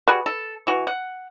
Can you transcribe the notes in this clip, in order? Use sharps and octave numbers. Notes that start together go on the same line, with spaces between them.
G3 F#4 G#4 B4 B5
A4
E3 F#4
F#5